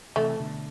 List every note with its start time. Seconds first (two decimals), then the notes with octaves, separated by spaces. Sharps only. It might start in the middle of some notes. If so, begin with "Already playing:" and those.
0.16 C3 E3 A3
0.40 B2 D3